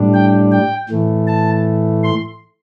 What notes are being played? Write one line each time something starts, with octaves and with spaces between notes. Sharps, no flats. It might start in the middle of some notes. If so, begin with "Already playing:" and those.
Already playing: A2 G3 D4
G5
G5
A2 E3 A3
A5
C6